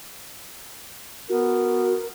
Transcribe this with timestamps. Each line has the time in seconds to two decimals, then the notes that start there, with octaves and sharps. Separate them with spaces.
1.29 B3 F#4 A#4